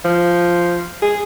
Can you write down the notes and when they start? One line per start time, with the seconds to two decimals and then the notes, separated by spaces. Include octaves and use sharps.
0.04 F3
1.02 G#4